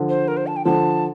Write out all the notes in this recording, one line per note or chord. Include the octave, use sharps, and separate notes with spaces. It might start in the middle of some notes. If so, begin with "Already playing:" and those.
Already playing: D3 F3
C5
A#4
C5
A5
G5
D3 F3 A5